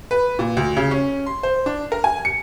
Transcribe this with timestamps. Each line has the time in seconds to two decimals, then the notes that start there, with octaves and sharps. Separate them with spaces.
0.11 B4
0.39 A#2
0.57 D2
0.77 C#3
0.91 C#4
1.26 C6
1.43 C5
1.66 D4
1.92 A#4
2.04 G#5
2.25 C#7